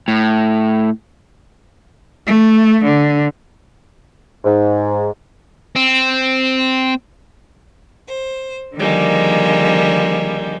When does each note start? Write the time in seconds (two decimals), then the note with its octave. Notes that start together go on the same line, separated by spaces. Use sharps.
0.08 A2
2.27 A3
2.85 D3
4.45 G#2
5.76 C4
8.07 C5
8.76 D3 D#3 F3 G3 G#3 A#3